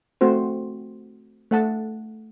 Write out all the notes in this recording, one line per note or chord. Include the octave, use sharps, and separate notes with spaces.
A3 C4 F#4 C5
A3 F#5 A5